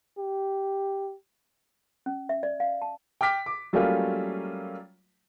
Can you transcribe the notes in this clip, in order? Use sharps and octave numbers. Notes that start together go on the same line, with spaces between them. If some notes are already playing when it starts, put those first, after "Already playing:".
G4
C#4
E5
D5
F5
A5
G5 D6 F6 B6
D6
F#3 G3 A3 A#3 C#4 F4